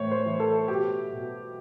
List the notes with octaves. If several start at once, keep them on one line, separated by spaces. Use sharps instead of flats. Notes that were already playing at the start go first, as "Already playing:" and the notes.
Already playing: A2 E3 C5 C#5
C5
E3
A4
B2 G4
B2